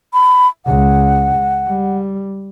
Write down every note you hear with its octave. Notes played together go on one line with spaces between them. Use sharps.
B5
C#2 F#5
G3